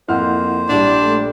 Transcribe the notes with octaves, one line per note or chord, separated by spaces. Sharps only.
F2 A#3 E4 C5 F#5 F6
A#1 G3 D4
A3 A4